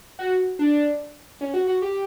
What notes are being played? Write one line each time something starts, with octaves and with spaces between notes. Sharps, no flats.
F#4
D4
C#4
F#4
F#4
G4